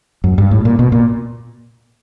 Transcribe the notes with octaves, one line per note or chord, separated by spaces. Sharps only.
F#2
G2
A2
A#2
B2
A#2